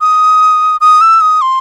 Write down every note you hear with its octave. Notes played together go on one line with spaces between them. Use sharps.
D#6
D#6
E6
D#6
C6